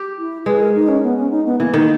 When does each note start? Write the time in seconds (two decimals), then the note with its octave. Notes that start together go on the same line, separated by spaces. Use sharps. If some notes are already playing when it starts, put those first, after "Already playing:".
Already playing: G4
0.19 E4
0.46 G#3 B4
0.60 A#4
0.75 D#4
0.88 C#4
1.03 B3
1.17 C#4
1.31 D#4
1.46 B3
1.60 E3 A#3
1.74 D#3